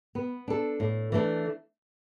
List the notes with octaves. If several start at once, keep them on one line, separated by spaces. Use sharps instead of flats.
B3
D4 A4
A2
E3 A3 D4